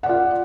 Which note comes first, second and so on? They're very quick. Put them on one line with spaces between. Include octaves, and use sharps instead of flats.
F#5 D5 F4